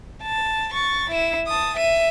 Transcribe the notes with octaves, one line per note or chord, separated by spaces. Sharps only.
A5
C#6 A6
E4 E7
A5 D#6
E5 D#7